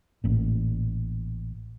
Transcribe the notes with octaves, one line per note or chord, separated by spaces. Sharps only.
A1 A#2